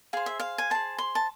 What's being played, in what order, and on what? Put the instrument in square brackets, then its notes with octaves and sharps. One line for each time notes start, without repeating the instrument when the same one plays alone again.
[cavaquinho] G#4 C5 F5
E5
F5
G#5
G#4 C5 A5
C6
A5